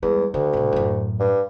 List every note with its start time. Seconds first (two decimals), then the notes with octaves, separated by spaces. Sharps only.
0.03 E2 G3 G#3
0.34 D2 D3
0.53 C2 A2
0.73 F#2 A2
1.20 G2